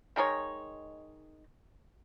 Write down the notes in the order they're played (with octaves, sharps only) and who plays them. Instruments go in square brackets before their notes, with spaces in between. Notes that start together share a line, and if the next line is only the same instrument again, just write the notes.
[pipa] D#3 G#3 D#4 C#5